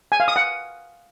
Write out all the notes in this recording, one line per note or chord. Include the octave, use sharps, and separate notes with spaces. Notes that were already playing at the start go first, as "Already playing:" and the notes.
G#5
F5
D#6
F#5